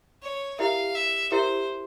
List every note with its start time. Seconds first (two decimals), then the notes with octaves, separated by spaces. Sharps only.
0.22 C#5
0.59 E4 G4 A#4 E5 F5
0.95 E5
1.32 E4 G4 A#4 C5 E5